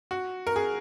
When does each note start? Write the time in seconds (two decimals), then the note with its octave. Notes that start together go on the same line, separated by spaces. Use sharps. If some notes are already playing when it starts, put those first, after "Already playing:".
0.11 F#4
0.47 A#4
0.56 G#4